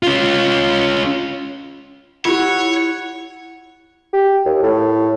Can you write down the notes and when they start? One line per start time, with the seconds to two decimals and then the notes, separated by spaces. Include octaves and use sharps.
0.03 C#4 F4
2.25 E4 F4 G4 C#5 F#5
4.13 G4
4.45 D#2
4.62 A2